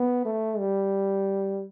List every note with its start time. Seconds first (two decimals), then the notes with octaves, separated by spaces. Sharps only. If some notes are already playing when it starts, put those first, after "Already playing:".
Already playing: B3
0.25 A3
0.59 G3